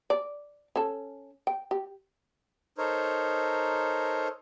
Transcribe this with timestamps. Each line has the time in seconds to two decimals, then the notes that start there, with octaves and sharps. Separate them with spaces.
0.10 D5
0.76 C#4 A4
1.47 G5
1.71 G4
2.78 D#4 A4 A#4 C5 C#5